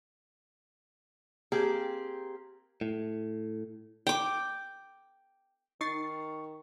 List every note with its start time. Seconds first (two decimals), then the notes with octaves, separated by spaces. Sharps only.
1.52 A#3 C4 G4 G#4
2.81 A2
4.07 G5 D6
5.81 D#3 D#4 C#6 A6 C7